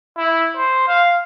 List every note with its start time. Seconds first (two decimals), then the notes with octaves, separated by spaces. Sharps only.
0.17 E4
0.56 C5
0.88 F5